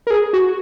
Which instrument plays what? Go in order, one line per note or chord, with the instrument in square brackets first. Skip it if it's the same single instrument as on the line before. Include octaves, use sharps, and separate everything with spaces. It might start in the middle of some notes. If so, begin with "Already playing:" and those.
[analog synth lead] A#4
G#4
F#4